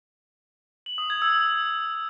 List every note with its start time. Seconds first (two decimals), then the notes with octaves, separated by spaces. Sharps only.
0.86 F#7
0.98 D#6
1.10 G#6
1.22 E6